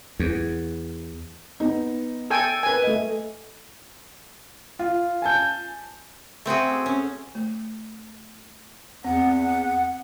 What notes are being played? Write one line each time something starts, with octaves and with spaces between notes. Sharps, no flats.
E2
B3 D#4
A4 G5 G#5
A#4 B4 G#5
A3 D#5
F4
G#5 A5 G6
A3 C4 F#4 G#4
C#4
A3
E2 C4 F#5